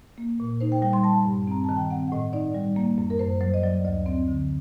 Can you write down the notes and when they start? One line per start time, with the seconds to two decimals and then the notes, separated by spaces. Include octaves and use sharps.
0.18 A#3
0.40 A#2
0.61 D#4 C5
0.72 G5
0.82 G3 G5
0.93 C6
1.04 G3 A5
1.25 G2
1.47 C4 A#5
1.64 D#3 A5
1.77 G5
1.91 C4 F#5
2.08 F#5
2.12 A2 D#5
2.33 D#4 D5
2.55 G3
2.76 A#3
2.98 F#2
3.10 A#4
3.19 F#2 C5
3.41 F#3 C5
3.54 D#5
3.63 F#3 D5
3.85 D2 D#5
4.06 C4
4.28 D3